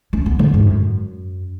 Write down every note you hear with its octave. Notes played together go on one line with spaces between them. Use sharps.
C#4
B3
D3
G#2
F#2